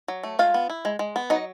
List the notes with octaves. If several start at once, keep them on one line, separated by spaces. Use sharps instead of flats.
F#3
A3
G#3 F4 F5
B3
E4
G#3
G#3
B3
F#3 D#4 D#5